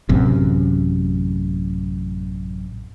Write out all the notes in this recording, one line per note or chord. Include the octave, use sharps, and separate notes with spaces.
A1 F#2 C3